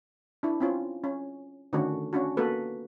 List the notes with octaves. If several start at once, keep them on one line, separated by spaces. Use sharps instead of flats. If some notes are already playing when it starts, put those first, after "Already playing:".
D4 E4
C4 C#4 F4
C#4
D3 D#3 A3 C#4 D4 F#4
C#4 D4 F#4
A#3 B3 F#4 A4 B4